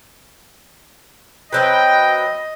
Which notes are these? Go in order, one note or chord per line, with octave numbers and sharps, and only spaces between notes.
F#3 C4 B4 D#5 G5